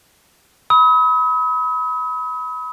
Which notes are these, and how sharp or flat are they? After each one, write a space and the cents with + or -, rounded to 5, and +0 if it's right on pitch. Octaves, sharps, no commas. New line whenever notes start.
B5 +0 D#6 +45